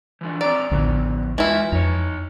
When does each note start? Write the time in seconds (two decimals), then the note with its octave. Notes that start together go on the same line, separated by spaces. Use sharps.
0.21 E3 F3 D4
0.41 C4 C#5 D5 A#5
0.72 A1 D2 F3 B3
1.38 E3 G#3 E4 F4
1.72 F2 D#4 C#5